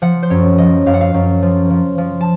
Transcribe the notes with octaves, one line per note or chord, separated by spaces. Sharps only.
F3 F#5
C5
F#2 C#5
F3 D#5
F#2 F5
F#5
F5
F#2
F3
F3
F3
A5